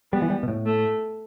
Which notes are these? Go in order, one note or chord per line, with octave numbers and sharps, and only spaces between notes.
G3 B3
E3
G3
B2
A2
A3